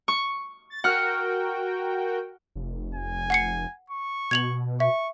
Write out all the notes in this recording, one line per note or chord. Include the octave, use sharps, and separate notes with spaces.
C#6
A6
F#4 A#4 F#5 G5 F6
F1
G#5
F#5 C7 C#7
C#6
B2 G#6 F7 F#7
E5 C#6